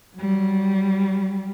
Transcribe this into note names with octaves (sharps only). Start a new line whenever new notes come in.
F#3 G3